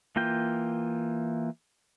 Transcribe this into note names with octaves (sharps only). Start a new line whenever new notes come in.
E3 A#3 F4 G5